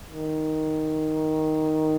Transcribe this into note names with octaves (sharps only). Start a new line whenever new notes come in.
D#3